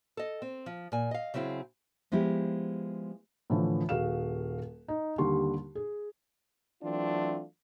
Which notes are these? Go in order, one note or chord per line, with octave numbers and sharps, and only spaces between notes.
A4 D#5
C4
F3
A#2 G#5
D#5 F5
C#3 F#3 C4 E4 G#4
F3 G#3 B3 E4 G4
A2 D3 E3 F3
D#1 F#4 G#4 F5 E7
D#4
D#2 D3 G3 C6 C#6
G#4
E3 F#3 A3 C4 D4 F4